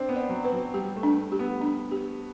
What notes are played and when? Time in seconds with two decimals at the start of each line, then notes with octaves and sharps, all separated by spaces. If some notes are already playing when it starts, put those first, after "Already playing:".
Already playing: C4 D4
0.09 B3
0.16 D5
0.30 F#3
0.45 B4
0.53 F#3
0.74 G3 G4
0.96 A3
1.03 D4
1.17 A3
1.32 G4
1.39 B3
1.61 D4
1.91 G4